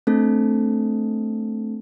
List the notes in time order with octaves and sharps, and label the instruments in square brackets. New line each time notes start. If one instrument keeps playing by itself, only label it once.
[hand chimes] A3 C4 D4 A4